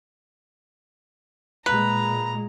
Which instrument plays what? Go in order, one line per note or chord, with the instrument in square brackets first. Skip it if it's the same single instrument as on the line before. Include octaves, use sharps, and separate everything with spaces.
[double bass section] A#2 G#3 [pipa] B4 [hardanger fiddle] A#5